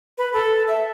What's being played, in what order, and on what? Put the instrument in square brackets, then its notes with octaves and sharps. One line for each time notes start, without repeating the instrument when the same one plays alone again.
[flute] B4
A4
E5